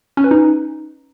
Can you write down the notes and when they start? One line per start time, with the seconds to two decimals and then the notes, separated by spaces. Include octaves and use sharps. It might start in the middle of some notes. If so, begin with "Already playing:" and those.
0.17 C#4
0.24 B4
0.31 D#4